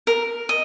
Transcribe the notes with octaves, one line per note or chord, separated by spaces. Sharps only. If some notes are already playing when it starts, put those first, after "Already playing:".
A#4
D#5